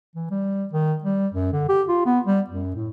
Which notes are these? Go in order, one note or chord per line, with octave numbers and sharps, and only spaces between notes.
E3
G3
D#3
G3
F#2
D3
G4
F4
B3
G3
F#2
A2